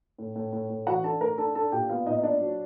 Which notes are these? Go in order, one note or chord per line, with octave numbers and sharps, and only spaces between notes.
A2
A2
A2
A2
E3 F#4 F#5
D4 A4 A5
A3 A#4 A#5
D4 A4 A5
D4 A4 A5
A#2 G4 G5
B3 F4 F5
A#2 D#4 D#5
D#5
D4 D5
F#3